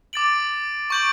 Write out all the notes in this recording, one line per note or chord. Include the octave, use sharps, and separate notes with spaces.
D6 A6 D7 F#7
C#6 G6 D7 F#7